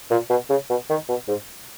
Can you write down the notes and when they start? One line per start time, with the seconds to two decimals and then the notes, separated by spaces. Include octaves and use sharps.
0.11 A#2
0.30 B2
0.50 C#3
0.70 B2
0.90 D#3
1.09 B2
1.28 G#2